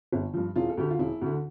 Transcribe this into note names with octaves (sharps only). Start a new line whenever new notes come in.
G1
G2 F3
E1 F4
A4
D2 D3 G4
F4
E1 E4
D2 D3